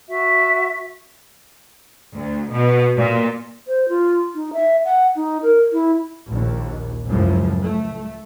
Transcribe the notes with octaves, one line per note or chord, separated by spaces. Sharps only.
F#4 E5
D2
B2
A#2
C5
F4
D#4
E5
F#5
D#4
A#4
E4
A#1 D#2
C#2 F#2 A2 F3
A3